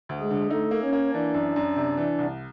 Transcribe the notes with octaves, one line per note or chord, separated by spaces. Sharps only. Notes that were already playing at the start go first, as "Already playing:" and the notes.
D2
G#3 G#4
D3
A3 D#4 A4
A#3
C#4 C#5
A#3
E3 D4 D5
F#2
F#2
C3
E3
C2